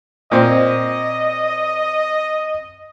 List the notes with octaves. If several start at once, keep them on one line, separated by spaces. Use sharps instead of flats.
A#2 C4 D#5